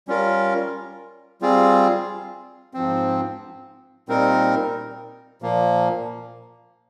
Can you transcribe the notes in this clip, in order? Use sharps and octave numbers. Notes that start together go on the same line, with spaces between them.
G3 C#4 F4 A#4
G3 C4 F4 G#4
G#2 F3 C4
A#2 G3 C4 D#4 A#4
A#2 F3 A#3